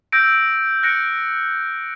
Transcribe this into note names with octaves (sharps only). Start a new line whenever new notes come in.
E6 G6 A#6 D7
F#6 A#6 C#7 D7